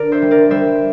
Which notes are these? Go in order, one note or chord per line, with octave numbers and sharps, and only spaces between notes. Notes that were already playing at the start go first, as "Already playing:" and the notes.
Already playing: D3 D4 A#4 D5
C5 E5
G3
A#4 D5
G3 C5 E5